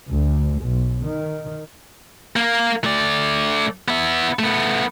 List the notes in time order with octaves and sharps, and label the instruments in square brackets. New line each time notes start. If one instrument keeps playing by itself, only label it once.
[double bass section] D2
B1
D#3
[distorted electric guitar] A#3
A3 D5
B3 E5
A3 B3